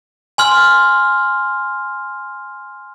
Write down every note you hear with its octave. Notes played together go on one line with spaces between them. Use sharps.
G#5 C6 F6